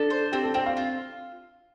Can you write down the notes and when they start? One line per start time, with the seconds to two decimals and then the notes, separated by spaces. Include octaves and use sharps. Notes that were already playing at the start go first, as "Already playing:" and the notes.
Already playing: D4 A4
0.10 C5
0.32 C4 G4
0.44 A4
0.54 C4 G5
0.66 F5
0.77 F4